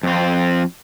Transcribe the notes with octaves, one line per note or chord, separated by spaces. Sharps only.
F2 C4